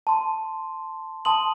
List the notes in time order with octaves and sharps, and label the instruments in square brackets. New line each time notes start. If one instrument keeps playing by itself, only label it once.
[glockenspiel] A5 C6
A5 C6 D#6 F#7